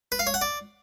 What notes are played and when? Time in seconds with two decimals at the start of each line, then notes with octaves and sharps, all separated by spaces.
0.12 B4
0.19 F5
0.27 C#5
0.34 F#5
0.41 D5